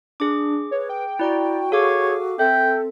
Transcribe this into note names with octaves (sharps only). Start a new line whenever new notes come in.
D4 G#4 D6
B4 C#5
G5
E4 F#4 D5 A#5
G#4 A4 C#5 F5 D6
C4 A4 E5 G5